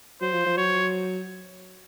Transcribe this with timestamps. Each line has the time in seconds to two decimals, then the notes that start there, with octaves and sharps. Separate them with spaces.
0.21 F#3 C5
0.33 F3
0.46 F3
0.57 F#3 C#5